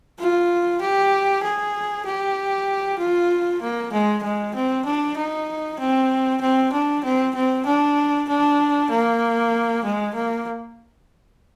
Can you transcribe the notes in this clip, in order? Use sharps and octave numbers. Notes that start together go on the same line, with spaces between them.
F4
G4
G#4
G4
F4
A#3
G#3
G#3
C4
D4
D#4
C4
C4
D4
C4
C4
D4
D4
A#3
G#3
A#3